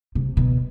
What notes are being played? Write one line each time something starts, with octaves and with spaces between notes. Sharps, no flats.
C3
B2